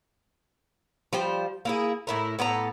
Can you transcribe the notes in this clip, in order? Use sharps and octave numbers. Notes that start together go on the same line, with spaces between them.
F3 G3 C5 G5
A#3 E4 G#4
A2 E4 A#4
A2 B3 A4 A#5